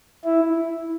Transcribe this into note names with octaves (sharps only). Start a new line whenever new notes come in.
E4